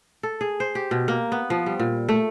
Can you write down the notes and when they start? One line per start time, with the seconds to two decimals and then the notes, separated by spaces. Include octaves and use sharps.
0.23 A4
0.41 G#4
0.60 C5
0.75 G4
0.91 B2
1.08 A#3
1.32 B3
1.50 F3
1.66 G3
1.80 A#2
2.09 A3